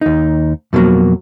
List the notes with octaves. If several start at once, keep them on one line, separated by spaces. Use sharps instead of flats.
D#2 D#4
F2 B2 D3 F#3 A#3